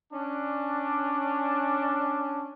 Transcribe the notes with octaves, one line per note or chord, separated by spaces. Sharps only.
C#4 D4